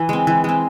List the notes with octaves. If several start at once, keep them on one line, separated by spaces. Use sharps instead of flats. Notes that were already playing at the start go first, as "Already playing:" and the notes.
Already playing: E3
G#3 C4
E3
G#3 C4